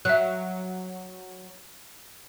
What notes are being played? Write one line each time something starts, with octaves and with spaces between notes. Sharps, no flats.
F#3 E5 F#6